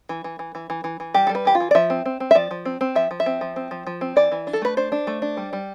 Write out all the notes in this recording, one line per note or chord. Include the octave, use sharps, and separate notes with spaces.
E3
E3
E3
E3
E3
E3
E3
G3 G4
G3 A4
B4
E3 G4
F4
E3
D5
F3 E5
C4
C4
C4
E5
F3 D5
F3
C4
C4
F3 E5
F3
E5
C4
F3
C4
F3
F3
C4
E3 D5
E3
D4
A4
A3 B4
D4 C5
D4
A3
D4
G3
G3